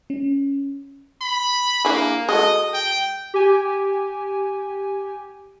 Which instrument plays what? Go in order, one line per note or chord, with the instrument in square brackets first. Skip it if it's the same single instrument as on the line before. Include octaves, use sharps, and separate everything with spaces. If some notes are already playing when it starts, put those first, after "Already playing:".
[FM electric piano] C#4
[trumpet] B5
[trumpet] A#3 [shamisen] D4 E4 G#4
[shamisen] G#3 F#4 A4 [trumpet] D#5
[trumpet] G5
[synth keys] G4 G#5